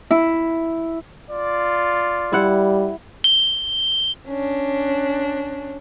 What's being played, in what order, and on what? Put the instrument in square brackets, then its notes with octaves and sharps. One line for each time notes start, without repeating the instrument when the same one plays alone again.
[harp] E4
[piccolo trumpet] F4 [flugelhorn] D5
[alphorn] G3 [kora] E4 F#5
[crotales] G7
[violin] C#4 D4